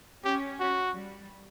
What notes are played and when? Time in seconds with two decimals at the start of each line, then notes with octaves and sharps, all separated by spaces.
0.25 C#4 G4
0.60 F#4
0.95 G3